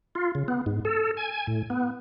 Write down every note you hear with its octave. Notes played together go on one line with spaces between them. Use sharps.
F4
C#3
B3
G#2
A4
G#5
A2
B3